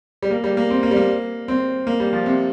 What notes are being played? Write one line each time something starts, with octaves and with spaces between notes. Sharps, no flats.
G3
A#3
G3
A#3
C4
A#3
G3
A#3
C4
A#3
G3
F3
C3